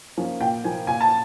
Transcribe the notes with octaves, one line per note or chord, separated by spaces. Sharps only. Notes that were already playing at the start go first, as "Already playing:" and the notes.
F3 A#3 C#4
A#2 G5
F3 A#3 G#5
A#2 G#5
A5